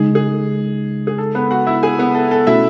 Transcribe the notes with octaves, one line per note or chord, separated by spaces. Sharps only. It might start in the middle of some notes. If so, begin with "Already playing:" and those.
Already playing: C#3 G#3 D#4 G#4
G#4
G#4
A4
B3 B4
F#4 F#5
E4 E5
G#4 G#5
B3 B4
A4
A4
B2 A3 C#4 E4 F#4 E5